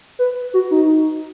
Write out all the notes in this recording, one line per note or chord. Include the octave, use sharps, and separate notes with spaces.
B4
F#4
D#4